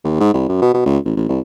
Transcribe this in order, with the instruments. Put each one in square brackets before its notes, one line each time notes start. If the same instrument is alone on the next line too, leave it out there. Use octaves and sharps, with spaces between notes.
[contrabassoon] D#2
G#2
C2
F#2
B2
B2
C#2
A1
A1
C2